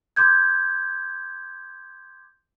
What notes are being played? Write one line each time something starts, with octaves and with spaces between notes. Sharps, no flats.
C6 D6 G6 G#6